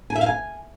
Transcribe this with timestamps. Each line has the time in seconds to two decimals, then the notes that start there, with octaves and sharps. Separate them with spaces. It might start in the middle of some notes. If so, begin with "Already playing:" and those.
0.10 G#5
0.15 E5
0.21 F5
0.26 G#5